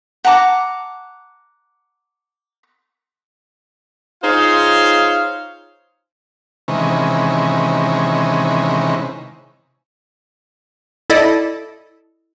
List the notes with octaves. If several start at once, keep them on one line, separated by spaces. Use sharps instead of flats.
F#5 A5 A#5 D6
D#4 F4 G#4 C5 C#5 F5
C3 D#3 E3 G#3 C#4
E4 A4 D5 D#5